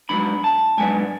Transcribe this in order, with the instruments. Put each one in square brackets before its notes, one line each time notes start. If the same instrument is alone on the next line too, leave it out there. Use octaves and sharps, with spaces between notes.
[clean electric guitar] G#2 F#3 B3 D4 B5
A5
G#2 F#3 B3 D4 G#5